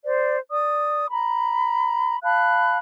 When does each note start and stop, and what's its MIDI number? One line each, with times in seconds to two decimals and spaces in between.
0.04 0.37 72
0.04 0.37 74
0.51 1.07 74
0.51 1.07 87
1.10 2.17 82
1.10 2.17 83
2.23 2.78 77
2.23 2.78 81
2.23 2.78 83
2.23 2.78 90